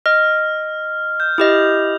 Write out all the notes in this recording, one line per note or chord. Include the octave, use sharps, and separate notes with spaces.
D#5 F6
G6
E4 G4 D#5 D#6 F7